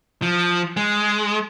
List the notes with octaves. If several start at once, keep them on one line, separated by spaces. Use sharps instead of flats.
F3
G#3